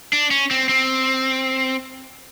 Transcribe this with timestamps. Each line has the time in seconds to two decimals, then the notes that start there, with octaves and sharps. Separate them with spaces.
0.13 D4
0.31 C#4
0.51 C4
0.69 C4